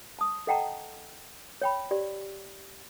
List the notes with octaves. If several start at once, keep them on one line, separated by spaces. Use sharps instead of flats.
A5 D#6
A4 D#5 F#5 G5 A5 A#5
C#5 G5 B5
G4 D5